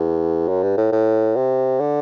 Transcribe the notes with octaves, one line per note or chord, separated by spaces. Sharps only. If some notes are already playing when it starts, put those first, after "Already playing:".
Already playing: E2
F#2
G2
A2
A2
C3
D3